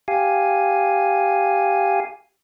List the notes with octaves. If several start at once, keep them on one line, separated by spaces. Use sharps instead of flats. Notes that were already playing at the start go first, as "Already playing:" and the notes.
G4 F5 G#5